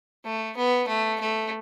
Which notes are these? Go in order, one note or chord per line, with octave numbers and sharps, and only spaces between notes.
A3
B3
A3
A3